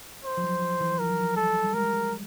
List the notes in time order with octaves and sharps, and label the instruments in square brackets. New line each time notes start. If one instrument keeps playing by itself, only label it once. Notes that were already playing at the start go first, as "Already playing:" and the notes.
[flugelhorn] C5
[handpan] F3
F#3
F3
E3
[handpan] F3 [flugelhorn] A#4
[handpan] F#3
F3
[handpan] G3 [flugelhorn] A4
[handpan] G3
[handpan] G#3 [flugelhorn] A#4